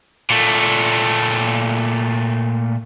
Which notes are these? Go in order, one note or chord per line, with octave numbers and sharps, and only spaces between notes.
A#2 A3